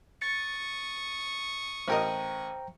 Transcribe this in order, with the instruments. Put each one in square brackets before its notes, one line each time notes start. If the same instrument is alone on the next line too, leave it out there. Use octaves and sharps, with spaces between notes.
[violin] C#6 D#6 [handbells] A6 C#7
[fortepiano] A1 A#4 D#5 [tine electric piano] C5 G5 A#5